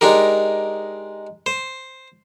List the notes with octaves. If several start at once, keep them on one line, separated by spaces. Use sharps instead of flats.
G#3 D4 D#4 G4 A#4
C5